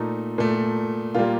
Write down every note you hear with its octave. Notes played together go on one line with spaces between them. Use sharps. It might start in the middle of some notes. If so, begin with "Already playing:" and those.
Already playing: A#2 A3 D#4
A#2 A3
A#2 G3 A#3 F4